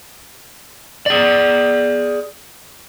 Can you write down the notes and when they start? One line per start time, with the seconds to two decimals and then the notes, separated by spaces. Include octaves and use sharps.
1.06 G#4 D5